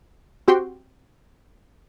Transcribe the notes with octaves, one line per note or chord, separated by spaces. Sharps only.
C4 F#4 G4 G5 C6